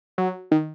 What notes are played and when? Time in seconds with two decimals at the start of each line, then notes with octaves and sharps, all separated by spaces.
0.18 F#3
0.51 D#3